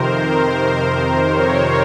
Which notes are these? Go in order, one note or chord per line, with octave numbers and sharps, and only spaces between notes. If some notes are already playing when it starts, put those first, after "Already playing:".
Already playing: F2 C3 D#3 A#4 C5
C#5